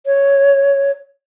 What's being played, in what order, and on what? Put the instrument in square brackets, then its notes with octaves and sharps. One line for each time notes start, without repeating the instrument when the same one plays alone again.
[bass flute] C#5